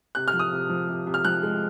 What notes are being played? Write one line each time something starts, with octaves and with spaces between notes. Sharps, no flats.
C3 F#6
F6
F3
D#6
C3
F3
C3
C3
F6
F3 F#6
G#3